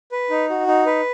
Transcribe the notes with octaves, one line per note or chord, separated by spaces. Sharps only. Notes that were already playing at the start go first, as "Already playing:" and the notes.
B4
D#4
F#4
D#4
B4